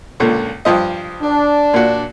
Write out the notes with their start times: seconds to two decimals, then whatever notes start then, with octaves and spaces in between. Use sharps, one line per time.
0.20 C#2 A#2 D3
0.65 G2 F3 D#5
1.23 D4
1.74 A#2 F#4